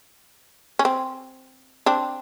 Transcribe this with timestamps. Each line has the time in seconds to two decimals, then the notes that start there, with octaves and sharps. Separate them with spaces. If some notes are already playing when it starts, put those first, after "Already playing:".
0.79 C#4
0.85 C4
1.86 C4 D4